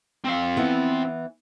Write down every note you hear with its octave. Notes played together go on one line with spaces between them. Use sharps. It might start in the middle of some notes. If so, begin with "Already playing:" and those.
C4 F5
E3 B3 E4